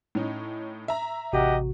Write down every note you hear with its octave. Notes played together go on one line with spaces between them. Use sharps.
A2 C#4 D#4
E5 A#5
A1 C3 F#4 G4 D#5 F#5